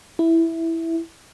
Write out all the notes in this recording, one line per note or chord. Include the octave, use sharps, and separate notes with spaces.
E4